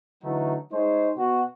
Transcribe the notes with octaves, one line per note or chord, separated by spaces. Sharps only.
D3 E3 F#3 A3 D#4
G#3 D#4 G#4 C5 C#5
B2 F#4